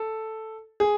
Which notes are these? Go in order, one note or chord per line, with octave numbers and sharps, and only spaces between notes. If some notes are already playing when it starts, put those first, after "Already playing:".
Already playing: A4
G#4